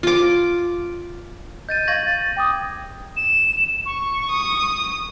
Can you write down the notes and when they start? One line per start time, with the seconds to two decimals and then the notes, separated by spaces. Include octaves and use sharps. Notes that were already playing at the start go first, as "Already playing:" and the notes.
0.03 F4 D6
1.69 D#5 G6 A6 D#7
1.88 F5 C#6 G#6 A#6 F#7
2.03 A6
2.37 G5 D6 D#6
3.17 E7
3.86 C#6
4.31 D#6